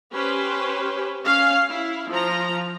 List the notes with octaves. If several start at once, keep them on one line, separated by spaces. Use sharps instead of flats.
C#4 G4 B4 C5
C#4 F5
E4
F3 A#5